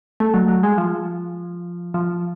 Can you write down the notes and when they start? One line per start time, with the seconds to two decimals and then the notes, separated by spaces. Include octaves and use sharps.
0.20 A3
0.34 F#3
0.48 F#3
0.63 G#3
0.78 F3
1.94 F3